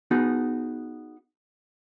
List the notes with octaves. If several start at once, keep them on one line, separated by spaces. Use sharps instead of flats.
B3 D#4 F#4 G#4